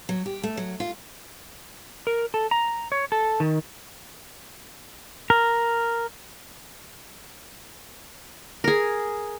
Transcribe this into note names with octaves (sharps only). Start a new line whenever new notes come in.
F#3
G4
A3
F#3
F4
A#4
A4
A#5
C#5
A4
D#3
A#4
G#4 A#4